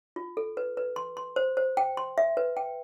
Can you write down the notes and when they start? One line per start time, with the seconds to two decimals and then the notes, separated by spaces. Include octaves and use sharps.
0.16 F4
0.37 A4
0.57 B4
0.77 B4
0.96 C6
1.17 C6
1.36 C5
1.57 C5
1.77 G5
1.97 C6
2.18 E5
2.37 B4
2.57 G5